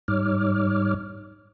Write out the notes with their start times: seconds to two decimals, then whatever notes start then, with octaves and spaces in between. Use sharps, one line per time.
0.08 G#2 G3 D#4 C#5 D6 F6